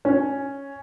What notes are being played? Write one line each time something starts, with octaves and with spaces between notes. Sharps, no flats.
C#4